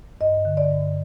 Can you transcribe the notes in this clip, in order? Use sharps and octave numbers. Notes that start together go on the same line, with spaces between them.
G2 D#5
D3
D5
G2